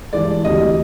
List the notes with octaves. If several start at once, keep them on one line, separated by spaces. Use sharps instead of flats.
G2 E3 G#3 D5
D2 C3 E3 G3 D#5